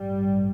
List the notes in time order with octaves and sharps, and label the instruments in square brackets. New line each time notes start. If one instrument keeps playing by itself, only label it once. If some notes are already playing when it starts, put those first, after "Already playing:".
Already playing: [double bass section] A1 G2 G3